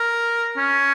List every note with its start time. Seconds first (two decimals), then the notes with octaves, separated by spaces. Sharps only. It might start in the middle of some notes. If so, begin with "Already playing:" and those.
Already playing: A#4
0.57 C#4